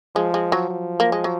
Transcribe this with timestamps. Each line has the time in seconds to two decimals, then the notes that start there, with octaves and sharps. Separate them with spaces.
0.15 F3 G#3
0.34 G#3
0.52 F#3
0.70 F3
1.00 A#3
1.12 G#3
1.24 F#3